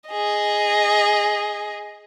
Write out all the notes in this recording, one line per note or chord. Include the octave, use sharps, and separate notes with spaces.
G#4 D#5